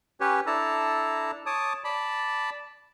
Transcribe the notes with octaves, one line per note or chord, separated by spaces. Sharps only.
C#4 G4 B4 C#5
D4 E4 A4 A5 A#5
C#5 A5 D6 D#6
D5 A5 B5